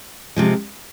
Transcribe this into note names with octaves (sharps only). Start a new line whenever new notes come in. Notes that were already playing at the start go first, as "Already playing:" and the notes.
C3 F3 G#3